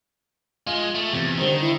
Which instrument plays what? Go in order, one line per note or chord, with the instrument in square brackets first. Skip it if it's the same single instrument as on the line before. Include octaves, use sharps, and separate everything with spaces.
[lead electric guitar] G#3 [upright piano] F4
[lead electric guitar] A3
[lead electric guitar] E2 [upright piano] C3
[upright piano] D3 G3 [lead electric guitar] D#3 [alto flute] C5
[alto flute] E4